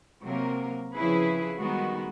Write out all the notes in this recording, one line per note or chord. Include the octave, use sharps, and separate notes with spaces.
C3 F#3 A#3 A#4
F2 C#3 F3 E4 G#4 B4
D#3 G3 G#3 B3 F#4